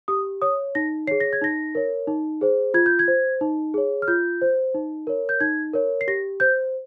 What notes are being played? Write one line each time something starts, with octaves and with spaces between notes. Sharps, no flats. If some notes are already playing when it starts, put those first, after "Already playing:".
G4 D#6
C#5 D#6
D#4 A#6
G#4 C#5 C7
A#6
G#6
D#4 A#6
A#4 C#5
D#4
G#4 C5
F4 G#6
G6
G#6
C5
D#4
G#4 C#5
F6
F4 G6
C5
D#4
A#4 C#5
G6
D#4 G#6
A#4 C#5
C7
G4 A#6
C5 G6